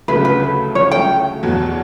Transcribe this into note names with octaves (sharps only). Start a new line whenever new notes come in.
D2 C#3 F#3 A3 B4
B4
C#5
G5
E2 B2 F#3